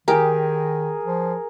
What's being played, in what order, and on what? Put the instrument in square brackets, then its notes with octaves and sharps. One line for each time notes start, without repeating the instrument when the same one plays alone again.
[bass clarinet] D#3 [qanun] G4 [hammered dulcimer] G#4 [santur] A#4
[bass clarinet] F3